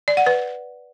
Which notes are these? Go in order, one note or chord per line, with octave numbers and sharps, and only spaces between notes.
D5
F#5
B4